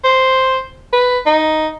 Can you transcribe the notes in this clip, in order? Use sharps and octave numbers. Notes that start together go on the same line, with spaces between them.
C5
B4
D#4